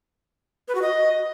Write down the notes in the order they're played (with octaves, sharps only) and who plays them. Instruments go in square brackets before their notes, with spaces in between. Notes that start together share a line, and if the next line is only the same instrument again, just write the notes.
[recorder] B4
F#4
D#5